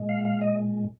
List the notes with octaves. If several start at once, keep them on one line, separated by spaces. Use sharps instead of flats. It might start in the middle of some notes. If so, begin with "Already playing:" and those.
Already playing: A#2 G#3
F5
F5
D#5